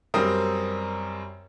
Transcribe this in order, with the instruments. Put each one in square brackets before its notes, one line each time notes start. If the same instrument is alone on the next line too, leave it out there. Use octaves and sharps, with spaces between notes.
[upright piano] F#2 G3 C4 A#4 D#6